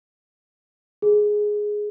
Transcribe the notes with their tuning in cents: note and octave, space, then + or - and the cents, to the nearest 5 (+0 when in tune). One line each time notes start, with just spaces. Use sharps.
G#4 +5